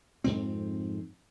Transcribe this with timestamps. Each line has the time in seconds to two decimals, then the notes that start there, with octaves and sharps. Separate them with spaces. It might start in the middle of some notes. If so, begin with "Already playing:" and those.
0.24 F2 G#2 C4